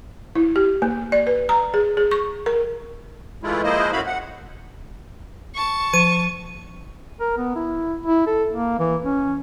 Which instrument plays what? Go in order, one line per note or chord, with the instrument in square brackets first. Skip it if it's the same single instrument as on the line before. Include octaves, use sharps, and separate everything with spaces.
[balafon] E4
G4
A#3
D5
B4
A#5
G#4
G#4
C#6
A#4
[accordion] E3 G#3 A3 E4 F4
F3 G#3 A#3 E4 C5 D#5
F#2 A2 E4 F#4 F5 B5
F#5
[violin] A5 C#6
[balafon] F3 [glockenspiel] D#7
[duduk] A#4
B3
E4
E4
A4
A#3
E3
C#4